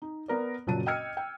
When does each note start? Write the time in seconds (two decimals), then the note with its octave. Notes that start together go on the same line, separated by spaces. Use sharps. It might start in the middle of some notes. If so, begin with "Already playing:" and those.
0.02 D#4
0.28 B3 A#4 D5
0.67 F#1 A#2 F#3 F#4 A5 D#7
0.86 D#5 G5 E6 F6 G#6 C#7
1.17 G5